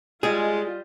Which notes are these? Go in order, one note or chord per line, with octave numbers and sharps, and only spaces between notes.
G3 G#3 F4 G#4 D#5